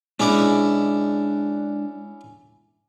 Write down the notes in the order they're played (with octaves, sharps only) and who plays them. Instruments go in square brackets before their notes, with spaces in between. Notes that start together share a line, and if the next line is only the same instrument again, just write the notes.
[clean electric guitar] G#3 D4 [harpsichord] C#4 E4 D5